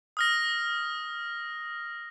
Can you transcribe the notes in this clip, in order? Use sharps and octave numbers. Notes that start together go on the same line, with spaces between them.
D#6 F6 A#6